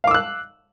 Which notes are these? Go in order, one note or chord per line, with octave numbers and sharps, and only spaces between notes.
F5 D6 E6 F#6